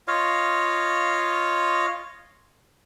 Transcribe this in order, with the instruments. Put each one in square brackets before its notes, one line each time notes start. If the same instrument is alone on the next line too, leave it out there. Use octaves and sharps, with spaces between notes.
[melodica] F4 C#5 D#5 F5